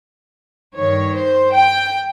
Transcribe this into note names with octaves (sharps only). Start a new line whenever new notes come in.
G2 D#3 C#5
C5
G5